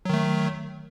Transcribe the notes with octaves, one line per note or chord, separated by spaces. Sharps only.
D#3 F#3 A3